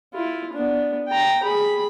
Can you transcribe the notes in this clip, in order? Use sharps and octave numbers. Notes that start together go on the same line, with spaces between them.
E4 F4
B3 D4
G5 A#5
G#4 B5